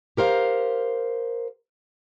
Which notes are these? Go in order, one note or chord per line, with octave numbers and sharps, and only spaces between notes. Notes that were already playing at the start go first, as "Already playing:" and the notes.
G4 A#4 C5 F5